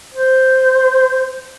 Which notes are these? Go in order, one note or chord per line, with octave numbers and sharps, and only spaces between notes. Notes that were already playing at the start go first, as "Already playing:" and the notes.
C5